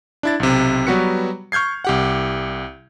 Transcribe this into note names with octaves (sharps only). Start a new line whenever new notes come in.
D4 E4 A6
B1 C3
F#3 G3 B3 F#4 B4 C#7
C#6 F6 G6 G#6 C7
C2 G4 F#5